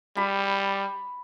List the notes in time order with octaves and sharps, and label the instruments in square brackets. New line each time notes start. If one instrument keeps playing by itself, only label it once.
[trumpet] G3 [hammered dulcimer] B5